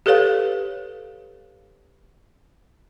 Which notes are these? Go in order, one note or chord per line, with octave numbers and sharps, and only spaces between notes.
G4 A4 B4 C#5 F5